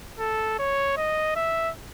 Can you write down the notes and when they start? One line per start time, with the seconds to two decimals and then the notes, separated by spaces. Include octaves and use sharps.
0.19 A4
0.59 C#5
0.97 D#5
1.36 E5